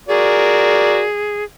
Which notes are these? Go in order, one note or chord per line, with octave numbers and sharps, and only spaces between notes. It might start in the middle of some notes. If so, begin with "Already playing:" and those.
F#4 G#4 A#4 D5